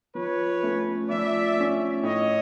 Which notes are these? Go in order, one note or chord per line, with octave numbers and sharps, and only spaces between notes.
F3 B4 C#5
A3 C#4
F3 D5 E5
A3 C#4
A2 C#5 D#5